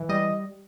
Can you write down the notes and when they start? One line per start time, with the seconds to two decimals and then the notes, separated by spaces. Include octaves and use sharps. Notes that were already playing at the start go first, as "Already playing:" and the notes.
Already playing: E3
0.09 G3 D#5